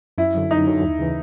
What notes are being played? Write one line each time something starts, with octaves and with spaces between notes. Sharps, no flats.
F#2 E4
D3 F#3
F#2 D#4
D3 F#3
D#2
C#3 E3